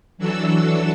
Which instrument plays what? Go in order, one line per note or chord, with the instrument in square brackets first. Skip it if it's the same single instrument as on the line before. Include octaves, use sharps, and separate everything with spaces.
[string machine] E3 F#3 D4 F#4 A4 E6